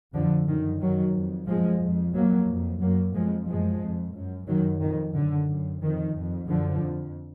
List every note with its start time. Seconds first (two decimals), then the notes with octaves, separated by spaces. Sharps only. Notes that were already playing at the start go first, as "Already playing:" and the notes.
0.13 F2 D3 F3
0.46 F#2 D#3
0.80 F#2 D#3 F#3
1.14 F2
1.47 F#2 F3 G#3
1.80 F2
2.14 F2 F#3 A#3
2.48 F2
2.81 F#2 F#3 A#3
3.14 F2 F3 G#3
3.47 F#2 F3 G#3
3.80 F2
4.14 F#2
4.47 F#2 D#3 F#3
4.81 F2 D#3
5.14 F#2 D3
5.47 F#2
5.81 F2 D#3
6.15 F2
6.47 F#2 D3 F3
6.81 F2